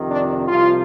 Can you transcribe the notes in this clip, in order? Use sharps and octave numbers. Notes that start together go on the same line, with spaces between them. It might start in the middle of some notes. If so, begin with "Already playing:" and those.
Already playing: F2 C3 D#3
D4
C2 C3 F3 F4